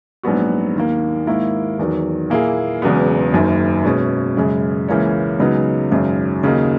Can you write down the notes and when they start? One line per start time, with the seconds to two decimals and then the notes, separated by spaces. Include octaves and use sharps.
0.23 A#1 G#2 F#3 B3 F#4
0.76 D#2 D#3 A#3
1.27 G#2 D#3 A#3 E4
1.79 E2 D#3 F#3
2.30 A#2 A#3 E4 G#4
2.82 E1 E2 C#3 F#3 B3
3.33 F#1 F#2 D#3
3.85 B2 G#3 C#4
4.37 F#2 C#3 G#3
4.88 C#2 C#3 E3 A#3 C#4
5.40 C#2 C#3 F#3 B3 D#4
5.91 G#1 F#2 C#3 F#3
6.43 D#2 C#3 F#3 A#3 D#4